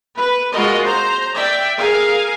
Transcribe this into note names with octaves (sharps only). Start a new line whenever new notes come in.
B4
G#3 F4 F#4 A#4 D#5
C5 A#5
D5 E5 G5
G#4 A#4 F5 G#5